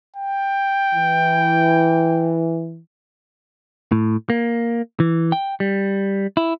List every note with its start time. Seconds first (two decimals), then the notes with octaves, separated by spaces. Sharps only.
0.17 G5
0.94 E3
3.92 A2
4.30 A#3
5.00 E3
5.32 G5
5.60 G3
6.37 E4